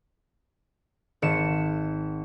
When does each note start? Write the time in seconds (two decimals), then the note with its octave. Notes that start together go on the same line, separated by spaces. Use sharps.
1.22 G#1 C#7 E7